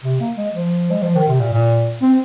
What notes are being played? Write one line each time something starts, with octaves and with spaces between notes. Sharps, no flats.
C3
A#3
G#3
F3
G#3
F3
D#3
C3
A#2
A#2
C4